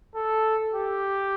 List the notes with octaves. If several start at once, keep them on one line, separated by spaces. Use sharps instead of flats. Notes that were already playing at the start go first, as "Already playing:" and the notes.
A4
G4